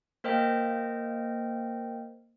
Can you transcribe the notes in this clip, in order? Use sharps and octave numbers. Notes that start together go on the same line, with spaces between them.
A#3 A#4 C5 D#5 G5